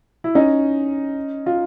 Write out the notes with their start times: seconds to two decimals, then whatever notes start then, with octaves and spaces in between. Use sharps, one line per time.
0.24 E4
0.35 C#4 D#4
1.46 F4